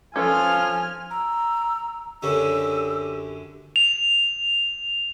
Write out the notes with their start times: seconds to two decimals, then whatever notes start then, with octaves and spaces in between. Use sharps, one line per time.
0.16 F3 C#4 F4 A4 B4 G#5 F6
1.11 A#5 E6
2.23 F#2 D3 C#4 G4 E6
3.76 F7